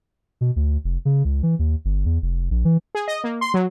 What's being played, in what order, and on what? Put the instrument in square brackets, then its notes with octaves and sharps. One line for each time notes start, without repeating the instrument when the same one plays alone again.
[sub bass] B2
D2
F1
C#3
C#2
E3
D#2
G1
E2
F1
A#1
E3
[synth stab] G#4
D#5
A#3
C6
F#3